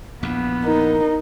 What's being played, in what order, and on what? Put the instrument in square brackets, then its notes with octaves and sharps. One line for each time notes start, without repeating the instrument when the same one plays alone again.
[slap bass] A#1 E2 [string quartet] B3
[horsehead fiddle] D#4 [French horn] A#4